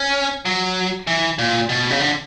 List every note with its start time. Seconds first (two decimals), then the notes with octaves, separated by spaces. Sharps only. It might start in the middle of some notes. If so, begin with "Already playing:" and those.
Already playing: C#4
0.45 F#3
1.07 E3
1.39 A#2
1.69 B2
1.90 C#3
2.00 D3